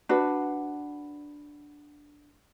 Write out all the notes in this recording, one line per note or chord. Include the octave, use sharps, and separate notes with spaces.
D4 F#4 B4